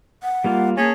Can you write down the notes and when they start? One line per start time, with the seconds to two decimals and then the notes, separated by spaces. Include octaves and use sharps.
0.23 F#5
0.44 G3 A#3 F4
0.77 A#3 C#4 G#4 A5